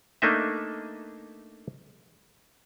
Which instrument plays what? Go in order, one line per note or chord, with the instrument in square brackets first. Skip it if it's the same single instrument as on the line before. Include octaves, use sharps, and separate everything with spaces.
[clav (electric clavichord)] A3 A#3 D4 D#4 D#5 E5